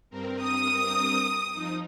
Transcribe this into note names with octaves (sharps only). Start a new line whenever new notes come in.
G2 C4 A#4
D#6
F3 D#4